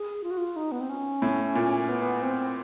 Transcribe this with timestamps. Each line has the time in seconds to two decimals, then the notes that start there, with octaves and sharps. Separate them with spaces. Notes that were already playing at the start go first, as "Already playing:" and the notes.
Already playing: G#4
0.24 F4
0.31 F#4
0.38 F4
0.56 D#4
0.72 B3
0.80 C4
0.89 C#4
1.22 A2
1.55 A#2
1.88 B3
2.22 C4